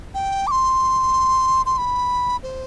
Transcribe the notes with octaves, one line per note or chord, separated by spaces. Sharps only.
G5
D6
C6
C6
B5
C5